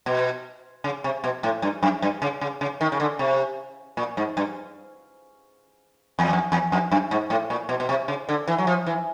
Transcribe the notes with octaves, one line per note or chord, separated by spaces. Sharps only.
B2
C#3
C3
B2
A2
G2
F#2
G2
C#3
C#3
C#3
D#3
C#3
D3
C3
A#2
G#2
G2
E2
F2
E2
F2
F#2
G#2
A2
A#2
B2
B2
C3
C#3
D3
E3
F#3
F3
E3